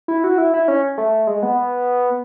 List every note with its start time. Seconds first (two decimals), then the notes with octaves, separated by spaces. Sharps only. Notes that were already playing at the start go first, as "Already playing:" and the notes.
0.08 E4
0.24 F#4
0.38 E4
0.54 E4
0.68 C#4
0.98 A3
1.27 G#3
1.43 B3